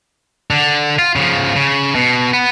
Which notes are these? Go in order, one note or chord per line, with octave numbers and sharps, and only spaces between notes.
D3
F4
C#3 F3
C#3
B2
B3